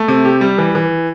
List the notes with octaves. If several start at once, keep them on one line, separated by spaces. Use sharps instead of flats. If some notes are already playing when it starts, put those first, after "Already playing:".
Already playing: A3
C3
G4
G3
E3
E3